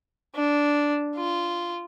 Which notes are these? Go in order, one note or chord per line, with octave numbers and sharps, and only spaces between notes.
D4
F4